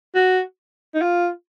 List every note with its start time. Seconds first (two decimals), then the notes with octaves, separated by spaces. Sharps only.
0.15 F#4
0.94 D#4
1.01 F4